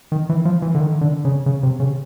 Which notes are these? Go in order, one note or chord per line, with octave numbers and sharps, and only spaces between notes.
D#3
E3
F3
E3
D3
D#3
D3
C#3
C#3
C3
C#3